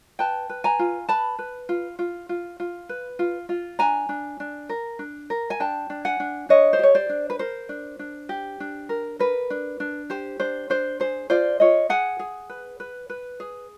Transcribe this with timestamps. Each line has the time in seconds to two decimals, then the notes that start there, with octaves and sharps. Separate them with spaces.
0.19 B4 G5 A5
0.49 B4
0.64 G#5 A#5
0.79 F4
1.09 B4 A5 B5
1.39 B4
1.69 F4
1.99 F4
2.29 F4
2.60 F4
2.89 B4
3.19 F4
3.49 F4
3.79 D4 G#5 A#5
4.09 D4
4.40 D4
4.69 A#4
4.99 D4
5.30 A#4
5.50 G#5
5.60 D4 G5 A5
5.90 D4
6.05 F#5 G#5
6.20 D4
6.49 D4 C#5 D#5
6.73 C5
6.79 G4 C#5
6.95 C5 D5
7.09 D4
7.30 B4
7.39 A#4 C5
7.69 D4
7.99 D4
8.29 G4
8.60 D4
8.89 A#4
9.19 A#4 B4
9.50 D4
9.80 D4
10.10 G4 C5
10.40 D4 C5
10.70 D4 C5
11.00 G#4 C5
11.30 F4 C5 D5
11.60 F4 C#5 D#5
11.89 G#4 F#5 G#5
12.19 G#4
12.49 B4
12.80 B4
13.10 B4
13.40 G#4